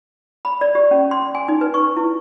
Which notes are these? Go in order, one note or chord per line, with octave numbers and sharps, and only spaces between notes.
B5
D5
G4
C#4
C6
G#5
D#4
B4
C#6
E4